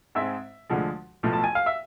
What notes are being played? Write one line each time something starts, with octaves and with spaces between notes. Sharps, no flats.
G#2 G#3 C4 E5
D2 D3 F3 G#3
B1 A2 F3 A3
A5
G#5
F5
E5